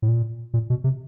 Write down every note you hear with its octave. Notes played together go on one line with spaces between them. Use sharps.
A2
A#2
A#2
B2
C3